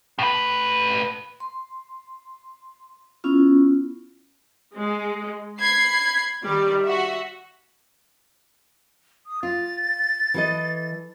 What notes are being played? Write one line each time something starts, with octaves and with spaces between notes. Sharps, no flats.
A2 B4
C6
B3 C#4 E4 F4
G#3
B5 G#6 C7
D#3 G3 D5
F#4 E5
D#6
F4 A6
E3 A4 D#5